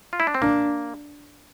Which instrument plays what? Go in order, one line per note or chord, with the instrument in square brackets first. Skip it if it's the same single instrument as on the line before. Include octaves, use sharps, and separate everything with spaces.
[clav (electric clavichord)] F4
E4
D4
C4
[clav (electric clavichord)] A#3 [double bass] D4